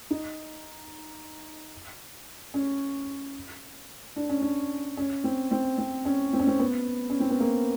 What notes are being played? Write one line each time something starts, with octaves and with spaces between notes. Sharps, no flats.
D#4
C#4
D4
C#4
D4
C#4
C4
C4
C4
C#4
C4
C#4
C4
B3
C#4
C4
B3
A#3